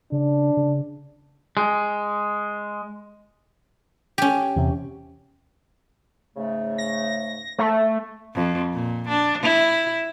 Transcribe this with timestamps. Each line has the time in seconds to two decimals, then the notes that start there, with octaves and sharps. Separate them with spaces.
0.12 C#3 D4
0.57 C#3
1.57 G#3
4.18 C#4 G4
4.56 E2 C3
6.36 G#2 C#3 A3
6.78 A#6
7.59 A3
8.35 F2
8.74 A#2
9.09 D4
9.44 E4